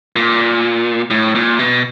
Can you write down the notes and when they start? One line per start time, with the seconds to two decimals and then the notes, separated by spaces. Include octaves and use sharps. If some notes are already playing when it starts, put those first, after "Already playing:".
0.16 A#2
1.10 A2
1.35 A#2
1.59 B2